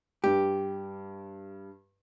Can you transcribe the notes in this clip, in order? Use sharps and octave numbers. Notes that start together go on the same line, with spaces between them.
G2 G4